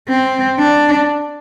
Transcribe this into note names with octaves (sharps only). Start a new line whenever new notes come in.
C4
D4